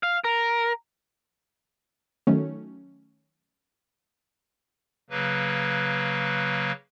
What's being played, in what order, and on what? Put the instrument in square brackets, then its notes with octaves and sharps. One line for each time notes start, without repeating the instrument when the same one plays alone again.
[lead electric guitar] F5
A#4
[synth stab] D#3 F#3 A3 C#4
[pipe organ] C#3 F#3 A#3 B4